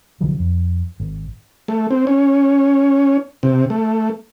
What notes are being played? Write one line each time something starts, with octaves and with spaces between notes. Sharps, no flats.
C2 D3 F3 F#3
F2
G#1
A3
C4
C#4
C3
A3